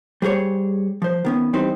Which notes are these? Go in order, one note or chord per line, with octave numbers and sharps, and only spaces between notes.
G3 G#4 C5 C#5
F3 C5
D#3 B3 C#4
E3 G3 C4 D#4 B4 C5